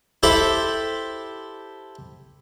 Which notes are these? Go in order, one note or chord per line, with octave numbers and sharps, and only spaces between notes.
E4 G4 A4 C5 E5 B5